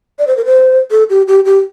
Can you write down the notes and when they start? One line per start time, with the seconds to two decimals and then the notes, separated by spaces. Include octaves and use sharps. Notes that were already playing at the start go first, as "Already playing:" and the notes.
0.19 D5
0.27 C5
0.37 A#4
0.45 C5
0.91 A4
1.10 G4
1.28 G4
1.45 G4